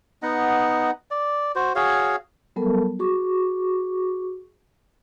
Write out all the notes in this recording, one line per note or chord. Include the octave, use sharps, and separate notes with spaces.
B3 D#4 D#5 F#5
D5
F#4 C5
F#4 G#4 C#5 F5
F#3 G3 B3 A4 A#4 A5
F#4 G#4 C#6 D6